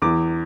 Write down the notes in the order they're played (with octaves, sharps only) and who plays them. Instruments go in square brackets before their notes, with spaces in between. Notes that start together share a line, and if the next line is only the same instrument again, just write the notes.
[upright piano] E2 D6